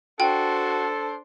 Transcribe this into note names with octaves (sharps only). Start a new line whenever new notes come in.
D4 F#4 A4 C5 G5